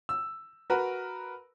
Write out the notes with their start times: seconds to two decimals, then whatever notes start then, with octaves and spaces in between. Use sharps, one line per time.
0.09 E6
0.70 F#4 A#4 B4